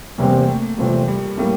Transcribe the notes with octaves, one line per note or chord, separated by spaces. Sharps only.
E2 C3 G3 A#3 C4
A3
E2 C3 F3 G3 A3 C4
G3
A2 G3 A3 A#3